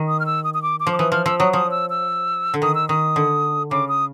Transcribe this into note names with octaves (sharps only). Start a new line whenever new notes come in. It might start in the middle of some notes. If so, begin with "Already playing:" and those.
Already playing: D#3
D#6
F6
E6
D#6
D#6
D6
D6
F3
D6
E3 D#6
F3 F6
F3 E6
F#3 D#6
F3 D#6
E6
E6
D3
D#3 D#6
E6
D#3 D#6
D3
C#3 D6
D#6